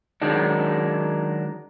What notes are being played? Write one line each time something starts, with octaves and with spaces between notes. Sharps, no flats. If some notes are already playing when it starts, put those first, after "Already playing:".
D#3 F#3 G#3 D4 D#4